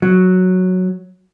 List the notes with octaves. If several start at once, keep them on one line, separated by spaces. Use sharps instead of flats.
F#3